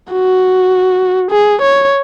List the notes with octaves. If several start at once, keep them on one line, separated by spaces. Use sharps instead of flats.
F#4
G#4
C#5